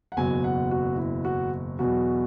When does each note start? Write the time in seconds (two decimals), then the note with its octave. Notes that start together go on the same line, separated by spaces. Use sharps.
0.12 F#5
0.17 F#1 E2 B2 F#3 G#5
0.44 F#5
0.71 F#4
0.97 E4
1.25 F#4
1.79 E2 B2 F#3 F#4